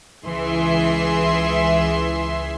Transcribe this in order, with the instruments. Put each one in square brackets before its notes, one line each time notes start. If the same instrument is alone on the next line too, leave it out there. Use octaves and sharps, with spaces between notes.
[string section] C#2 E3 G#4 E5 C6